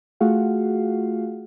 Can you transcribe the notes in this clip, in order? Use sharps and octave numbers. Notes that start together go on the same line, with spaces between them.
A3 F4 F#4 G#4 F5 F#5